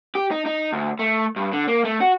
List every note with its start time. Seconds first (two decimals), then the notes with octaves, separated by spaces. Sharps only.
0.15 G4
0.31 D#4
0.46 D#4
0.73 D2
0.99 A3
1.36 G2
1.53 D3
1.68 A#3
1.85 A3
2.01 F#4